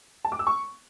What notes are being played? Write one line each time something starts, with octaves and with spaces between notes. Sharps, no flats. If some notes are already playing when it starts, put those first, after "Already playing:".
A5
D6
E6
C#6